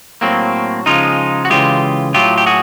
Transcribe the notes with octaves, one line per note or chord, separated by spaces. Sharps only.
A2 F#3 A#3 C4
C#3 F3 G#3 D#4 F4
F#4
C#3 E3 G#3 F4 G4
A2 F#3 F4 G4
G4
F#4 G#4